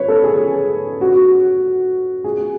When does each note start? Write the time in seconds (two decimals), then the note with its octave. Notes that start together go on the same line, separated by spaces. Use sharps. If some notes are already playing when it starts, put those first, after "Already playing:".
Already playing: B4 C#5
0.08 A4
0.24 G#4
1.01 F#4
2.24 G#4